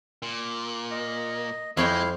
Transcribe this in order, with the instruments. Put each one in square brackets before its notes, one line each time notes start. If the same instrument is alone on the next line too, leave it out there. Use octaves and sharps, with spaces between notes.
[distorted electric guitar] A#2
[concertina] D#5
[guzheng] F2 C#5 G5 [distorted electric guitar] G#3 [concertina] E4 F5